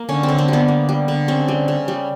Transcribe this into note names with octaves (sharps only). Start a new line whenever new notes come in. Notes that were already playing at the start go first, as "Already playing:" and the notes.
Already playing: A#3
D3 C#4
C4
D3
C4
G3 B3
A#3
G3
D3
C#3 C4
G3
C#3
G3